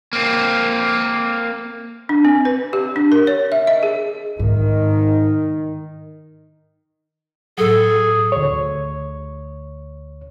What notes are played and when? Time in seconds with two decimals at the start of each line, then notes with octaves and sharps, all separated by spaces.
0.13 A#3 C4
2.09 D4
2.25 C4
2.45 B4
2.73 G4
2.96 D4
3.12 A#4
3.27 C#5
3.52 E5
3.67 D#5
3.83 G#4
4.39 G#2 D#3
7.58 A2 F#3 G#4 A4
8.32 D2 C#5